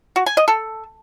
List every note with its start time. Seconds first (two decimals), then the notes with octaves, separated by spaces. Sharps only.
0.16 F#4
0.26 G#5
0.37 D#5
0.48 A4